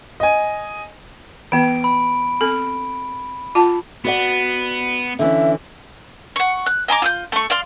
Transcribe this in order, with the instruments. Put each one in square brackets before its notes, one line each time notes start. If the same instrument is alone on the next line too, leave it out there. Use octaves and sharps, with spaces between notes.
[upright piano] D#5 G#5
[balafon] E3 B3 [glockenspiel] D7
[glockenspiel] B5
[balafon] C4 A4
F4 A5
[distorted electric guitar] B3 [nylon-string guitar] F#4 D5 F#5
[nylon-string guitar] D3 E3 C#4 [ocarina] E5
[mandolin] F#5 C#6
F#6
D#5 G#5 A#5 D6
F4 E6 G6
A3 C#6
D5 F5 C6